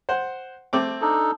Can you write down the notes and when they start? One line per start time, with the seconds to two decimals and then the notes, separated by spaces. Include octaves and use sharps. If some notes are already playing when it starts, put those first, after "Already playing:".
0.09 C5 F#5
0.73 A3 C4 D6
1.02 D4 D#4 A4